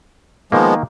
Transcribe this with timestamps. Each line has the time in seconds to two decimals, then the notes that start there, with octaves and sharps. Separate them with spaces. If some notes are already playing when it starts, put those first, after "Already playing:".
0.52 D#3 F3 G#3 A#3 B3